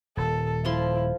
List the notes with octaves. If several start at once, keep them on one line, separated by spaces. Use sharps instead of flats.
D#1 A4
F3 E4 F4 C6